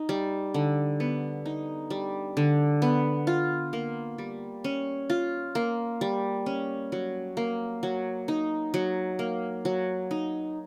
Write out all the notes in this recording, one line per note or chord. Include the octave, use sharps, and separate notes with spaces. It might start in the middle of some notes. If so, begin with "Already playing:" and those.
Already playing: D#4
G3
D3
B3
D#4
G3
D3
B3
F4
A#3
G3
C#4
F4
A#3
G3
C#4
F#3
A#3
F#3
D#4
F#3
A#3
F#3
D#4